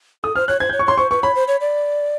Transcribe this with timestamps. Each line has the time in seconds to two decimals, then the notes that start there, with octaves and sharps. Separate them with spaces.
0.24 A4 D#6
0.35 C5 F6
0.48 C#5 F#6
0.60 C5 G#6
0.69 C#5 G6
0.79 C#6
0.86 C#5 C6
0.98 C5 C#6
1.11 B4 C#6
1.23 C#5 B5
1.35 C5
1.48 C#5
1.61 D5